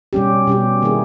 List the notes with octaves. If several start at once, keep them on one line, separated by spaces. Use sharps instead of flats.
B2 G3 C#4 G4
B2 G3 C#4 G4
D#3 A#3 E4 G#4